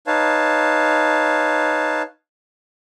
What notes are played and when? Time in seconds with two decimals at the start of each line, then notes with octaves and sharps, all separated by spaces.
0.07 D#4 B4 C#5 F5 A5